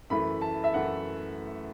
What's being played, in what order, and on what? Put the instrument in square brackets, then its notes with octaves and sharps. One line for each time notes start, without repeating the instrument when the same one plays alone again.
[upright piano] F#2 E3 A3 B5
A5
E5
F#2 E3 A3 F#5